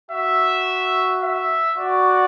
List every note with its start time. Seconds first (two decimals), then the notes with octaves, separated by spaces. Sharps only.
0.11 F#4 E5
1.23 E5
1.78 F#4 D5